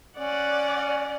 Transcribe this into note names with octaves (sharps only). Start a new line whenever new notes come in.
C#4 D5 F#5